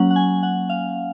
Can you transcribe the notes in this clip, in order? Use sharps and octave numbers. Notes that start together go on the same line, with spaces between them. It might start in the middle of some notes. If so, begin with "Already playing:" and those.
Already playing: F#3 A#3 C#4 F#5
F#5
G#5
F#5
F5